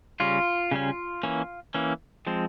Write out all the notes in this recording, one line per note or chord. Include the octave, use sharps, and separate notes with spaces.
C#3 G3 C#4 F4
C#3 G3 C#4
E3 A#3 C#4
E3 A#3 C#4
F3 G#3 C4